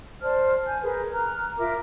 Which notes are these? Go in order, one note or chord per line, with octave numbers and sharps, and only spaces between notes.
C5 D5 A5 F6
G#5 G6
G#4 A#4 B4
A#5 F6 F#6
F4 A#4 E5 D6